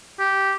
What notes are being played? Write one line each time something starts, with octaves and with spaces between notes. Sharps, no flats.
G4